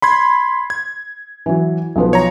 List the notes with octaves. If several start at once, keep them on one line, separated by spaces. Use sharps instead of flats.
B5 C6 G#6
G#6
E3 F#3
B1 F3 B4
C#5 A#5